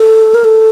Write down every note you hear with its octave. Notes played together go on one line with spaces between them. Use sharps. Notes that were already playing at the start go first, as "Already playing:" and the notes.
Already playing: A4
A#4
A4